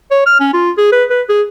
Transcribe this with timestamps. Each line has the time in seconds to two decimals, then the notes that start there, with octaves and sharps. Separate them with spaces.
0.11 C#5
0.27 F6
0.40 C#4
0.54 F4
0.78 G#4
0.92 B4
1.10 B4
1.29 G#4